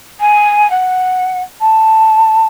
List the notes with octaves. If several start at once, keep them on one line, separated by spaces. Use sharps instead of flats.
G#5
F#5
A5